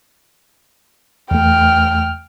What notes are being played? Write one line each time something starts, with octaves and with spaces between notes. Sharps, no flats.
E2 A3 G5 F6